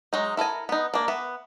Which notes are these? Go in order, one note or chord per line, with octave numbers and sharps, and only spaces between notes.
F#3 G#3 D#4
E4 A4 A#4 G#5
B3 D#4
A#3 D4
B3 E5